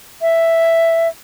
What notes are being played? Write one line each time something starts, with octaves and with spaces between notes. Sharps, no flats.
E5